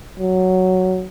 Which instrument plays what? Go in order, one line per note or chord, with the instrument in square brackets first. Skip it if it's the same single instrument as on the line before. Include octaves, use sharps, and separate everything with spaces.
[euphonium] F#3